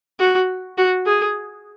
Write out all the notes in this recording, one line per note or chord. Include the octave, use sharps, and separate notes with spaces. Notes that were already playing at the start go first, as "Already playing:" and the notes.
F#4
F#4
G#4